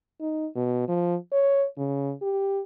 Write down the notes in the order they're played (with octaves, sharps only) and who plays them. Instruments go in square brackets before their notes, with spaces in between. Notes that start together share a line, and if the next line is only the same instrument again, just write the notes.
[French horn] D#4
B2
F3
C#5
C#3
G4